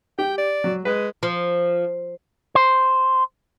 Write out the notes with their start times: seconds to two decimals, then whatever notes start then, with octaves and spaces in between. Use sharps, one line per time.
0.19 G4 G5
0.38 D5
0.64 F#3
0.85 G#3 B4
1.23 F3
2.55 C5